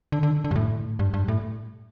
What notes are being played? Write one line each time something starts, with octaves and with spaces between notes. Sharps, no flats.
D3
D3
D3
G2
A2
G2
G2
A2